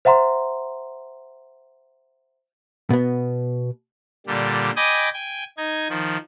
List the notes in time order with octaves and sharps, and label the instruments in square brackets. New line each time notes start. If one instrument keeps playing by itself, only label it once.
[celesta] C5 E5 F#5 A#5 C6
[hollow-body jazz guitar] B2 B3
[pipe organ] A#2 D3 G3
D#5 G5 G#5 B5 D6 D#6
G5 G#5
D#4 G#6
D#3 F3